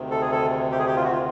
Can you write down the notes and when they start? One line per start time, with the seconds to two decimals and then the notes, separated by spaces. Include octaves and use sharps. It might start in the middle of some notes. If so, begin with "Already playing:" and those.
Already playing: D2 C3 D#3
0.11 A4
0.21 G#4
0.32 A4
0.72 G4
0.79 G#4
0.87 G4
0.96 F4
1.04 F#4
1.12 F4